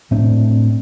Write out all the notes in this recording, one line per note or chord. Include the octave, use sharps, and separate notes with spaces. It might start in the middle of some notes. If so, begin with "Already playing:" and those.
A2 A3 C4 D4